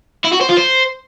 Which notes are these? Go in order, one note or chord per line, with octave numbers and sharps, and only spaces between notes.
E4
F#4
C5
F4
C5